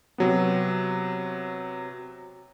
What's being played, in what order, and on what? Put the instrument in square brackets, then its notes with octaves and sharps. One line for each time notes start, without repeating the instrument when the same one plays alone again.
[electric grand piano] C3 F#3 B3